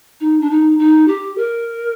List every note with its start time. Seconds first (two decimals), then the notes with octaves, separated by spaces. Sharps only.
0.21 D#4
0.41 D4
0.50 D#4
0.79 D#4
1.08 G4
1.38 A#4